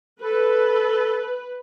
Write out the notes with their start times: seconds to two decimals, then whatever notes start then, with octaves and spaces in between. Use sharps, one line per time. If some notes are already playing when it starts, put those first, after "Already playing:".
0.22 A4 B4